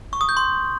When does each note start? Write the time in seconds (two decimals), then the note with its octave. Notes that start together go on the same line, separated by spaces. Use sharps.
0.13 C#6
0.21 D#6
0.29 G6
0.37 C6